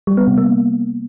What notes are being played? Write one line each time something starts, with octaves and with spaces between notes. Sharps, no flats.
G3
B3
C3
A#3